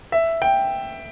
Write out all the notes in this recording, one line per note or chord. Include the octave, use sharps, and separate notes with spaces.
E5
G5